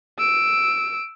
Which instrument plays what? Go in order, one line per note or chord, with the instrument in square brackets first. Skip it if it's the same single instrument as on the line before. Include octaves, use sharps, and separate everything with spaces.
[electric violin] E6 D7